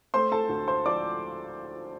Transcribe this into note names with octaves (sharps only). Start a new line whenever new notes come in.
A3 C5 C6
A4 A5
D2
C5 C6
F3 D5 D6